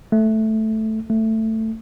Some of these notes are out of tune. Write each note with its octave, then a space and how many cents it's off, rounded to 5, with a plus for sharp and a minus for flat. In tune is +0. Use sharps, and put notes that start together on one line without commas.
A3 -5
A3 +10